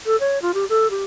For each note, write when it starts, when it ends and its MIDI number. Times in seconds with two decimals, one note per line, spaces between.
0.06 0.16 69
0.20 0.38 73
0.42 0.51 65
0.54 0.65 67
0.69 0.90 69
0.90 1.04 67